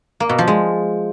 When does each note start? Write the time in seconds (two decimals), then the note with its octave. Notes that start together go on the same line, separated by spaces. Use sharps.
0.20 A#3
0.29 B2
0.38 F3
0.47 G#3